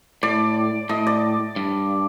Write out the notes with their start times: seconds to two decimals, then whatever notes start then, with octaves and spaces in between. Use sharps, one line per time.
0.23 A2 D5
0.89 A2 D#5
1.07 D5
1.56 G2